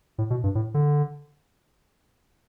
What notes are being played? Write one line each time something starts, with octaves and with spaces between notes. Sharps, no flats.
A2
B2
G2
A2
D3